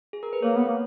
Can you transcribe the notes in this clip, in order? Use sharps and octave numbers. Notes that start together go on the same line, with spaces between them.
G#4
A#4
B4
A#3 C#5
B3
A#3